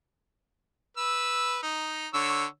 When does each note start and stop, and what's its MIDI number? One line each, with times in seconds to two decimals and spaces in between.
0.97 1.59 71
0.97 1.59 88
1.63 2.08 63
2.14 2.45 50
2.14 2.45 73
2.14 2.45 88